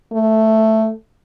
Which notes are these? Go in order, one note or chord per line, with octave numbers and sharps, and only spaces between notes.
A3